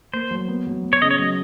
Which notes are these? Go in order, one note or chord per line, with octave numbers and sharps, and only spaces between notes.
A#3 C5
F#3
B3
F#3
B3
C#5
C#3 D#5
C#5
F#3 D#5